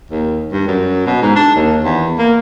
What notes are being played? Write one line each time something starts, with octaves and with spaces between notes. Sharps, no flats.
D#2
G2
F#2
B2
G#2
D4
D#2
E2
A#3